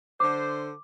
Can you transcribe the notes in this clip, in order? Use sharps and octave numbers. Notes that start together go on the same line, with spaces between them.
D3 C5 D6